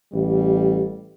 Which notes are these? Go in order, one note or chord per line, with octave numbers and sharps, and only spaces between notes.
A1 G3